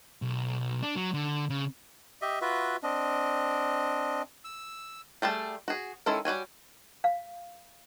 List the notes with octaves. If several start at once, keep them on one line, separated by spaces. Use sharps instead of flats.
B1
D4
F#3
D3
C#3
G4 D#5 E5
F4 F#4 B4 E5
C4 D4 D#5
E6
G3 A3 G#4 A5
F#4 G#4
D#3 G#3 C#4 E4 A4
G3 F#4 C#5 G#5
F5